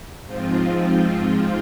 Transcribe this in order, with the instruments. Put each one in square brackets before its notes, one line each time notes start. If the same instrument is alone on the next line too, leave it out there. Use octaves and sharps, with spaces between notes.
[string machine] G#2 F3 C4 F4